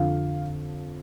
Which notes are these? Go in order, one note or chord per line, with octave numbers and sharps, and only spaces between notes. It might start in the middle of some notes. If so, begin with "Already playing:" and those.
Already playing: F2 D3 F3 F5